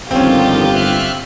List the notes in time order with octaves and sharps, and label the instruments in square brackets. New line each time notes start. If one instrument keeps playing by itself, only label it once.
[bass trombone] G1 [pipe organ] D3 D#3 F3 [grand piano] C4 C#4 [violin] F4 G4
[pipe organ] E5 F6 F#6